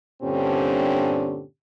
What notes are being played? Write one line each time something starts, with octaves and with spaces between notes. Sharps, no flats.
G2 A#2 D3 C4 C#4 G4